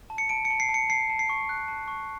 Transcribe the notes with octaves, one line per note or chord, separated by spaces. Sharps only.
A5
C#7
A5 D7
C#7
A5
C7
A5
C#7
A5 C7
A5
C7
C#6
F#6
A5
C#6